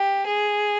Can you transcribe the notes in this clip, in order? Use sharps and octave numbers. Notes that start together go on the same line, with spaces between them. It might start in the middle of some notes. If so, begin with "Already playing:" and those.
Already playing: G4
G#4